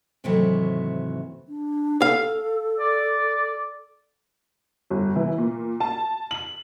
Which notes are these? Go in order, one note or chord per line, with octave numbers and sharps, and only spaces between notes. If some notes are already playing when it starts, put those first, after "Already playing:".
G#2 C3 D#3 E3 F#3 A3
D4
A4 F5
D5
G1
E3
A#2
A5
F#7